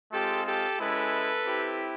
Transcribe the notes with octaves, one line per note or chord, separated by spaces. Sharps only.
G#3 C4 F4 G4 A4
G4 A4
G#3 C#4 E4 A4 B4
C4 E4 G4